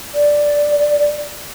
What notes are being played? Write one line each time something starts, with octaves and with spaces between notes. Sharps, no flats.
D5